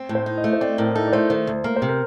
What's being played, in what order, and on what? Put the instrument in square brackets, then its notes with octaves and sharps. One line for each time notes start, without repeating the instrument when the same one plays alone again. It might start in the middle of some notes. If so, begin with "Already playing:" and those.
Already playing: [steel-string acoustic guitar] C4
A2
[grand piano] C5
[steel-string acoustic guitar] D#4
[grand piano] D#5
[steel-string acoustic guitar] A3
[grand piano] C5
[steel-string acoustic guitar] C4 [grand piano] D5
[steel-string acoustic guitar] A2 [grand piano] A#4
[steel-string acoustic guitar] D#4 [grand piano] A4
[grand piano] D5
[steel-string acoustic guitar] A3 [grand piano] C5
[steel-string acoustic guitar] D#3 [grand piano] C5
[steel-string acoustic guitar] D2
[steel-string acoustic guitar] A#3 [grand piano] A#4
[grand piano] C5
[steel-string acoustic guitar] C3
[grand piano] A#4